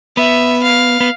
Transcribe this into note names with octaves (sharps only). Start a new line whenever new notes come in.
B3 E5
F5
B3